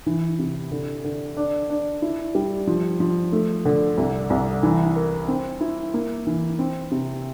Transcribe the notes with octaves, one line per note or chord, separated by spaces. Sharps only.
E3
C3
D3
D3
D4
D4
E4
G3
F3
F3
A3
D3
C2
C2
E3
A#4
C4
E4
A#3
E3
C4
C3